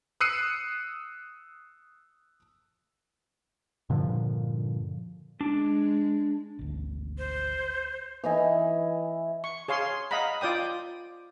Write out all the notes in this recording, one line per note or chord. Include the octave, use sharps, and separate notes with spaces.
D#6 E6 F#6 C7 C#7 D#7
G2 A#2 D3 F3
G#3 D4 D6
G#1 D2
C5
E3 E4 D#5 G#5
C#6
G#4 C#5 F5 C6
D#5 F5 F#5 A#5 B5
F4 D5 G5 D#6